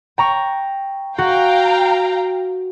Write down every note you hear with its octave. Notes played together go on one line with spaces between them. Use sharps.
G5 A#5 C#6
F#4 F5 G5 A#5